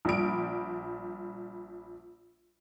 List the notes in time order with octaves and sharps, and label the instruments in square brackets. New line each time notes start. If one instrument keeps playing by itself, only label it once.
[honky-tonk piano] A#1 G3 D7